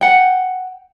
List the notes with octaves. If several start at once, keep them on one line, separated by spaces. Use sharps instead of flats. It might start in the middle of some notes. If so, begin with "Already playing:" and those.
F#5 G5